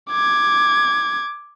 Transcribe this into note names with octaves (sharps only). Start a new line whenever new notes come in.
D6 G#6